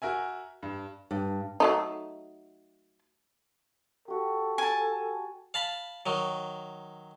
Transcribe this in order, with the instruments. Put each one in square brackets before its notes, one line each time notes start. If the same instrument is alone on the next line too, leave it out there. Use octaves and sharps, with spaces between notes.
[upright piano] F#4 A#4 E5 G#5
G2
[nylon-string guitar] G2
[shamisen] F#3 A3 D#4
[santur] F#4 G4 [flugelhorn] A4
[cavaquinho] G#5 A5
[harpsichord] F5 A5 B5
D#3 F#3